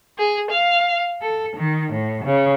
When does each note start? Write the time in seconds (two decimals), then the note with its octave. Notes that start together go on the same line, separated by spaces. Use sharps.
0.18 G#4
0.50 F5
1.21 A4
1.56 D#3
1.92 A2
2.24 C#3